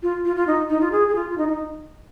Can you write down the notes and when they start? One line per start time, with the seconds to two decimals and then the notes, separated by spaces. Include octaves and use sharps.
0.03 F4
0.25 F4
0.36 F4
0.47 D#4
0.70 D#4
0.81 F4
0.92 G#4
1.08 G#4
1.15 F4
1.30 F4
1.38 D#4
1.48 D#4